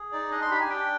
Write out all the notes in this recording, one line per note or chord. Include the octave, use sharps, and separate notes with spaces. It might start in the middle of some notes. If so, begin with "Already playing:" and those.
Already playing: G#4
D#4 D5
D4 D#5
C6
G4 B5
G#5
D4 G5